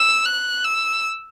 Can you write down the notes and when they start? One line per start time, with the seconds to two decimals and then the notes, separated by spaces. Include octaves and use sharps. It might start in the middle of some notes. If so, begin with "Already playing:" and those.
Already playing: E6
0.26 F#6
0.64 E6